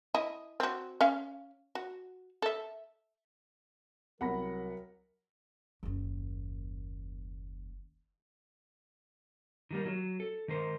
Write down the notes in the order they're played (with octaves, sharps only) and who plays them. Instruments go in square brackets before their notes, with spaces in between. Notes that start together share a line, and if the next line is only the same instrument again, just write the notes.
[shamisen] E4 D#5
C4 F#4
C#4 F5
F#4
A4 E5
[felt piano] C2 [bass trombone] F#3 [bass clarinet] A#4 [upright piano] F#5 B5 A#6
[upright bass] F#1 D#2
[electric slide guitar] D#3 G3 A#3
F#3
A4
D#3 A#4 C5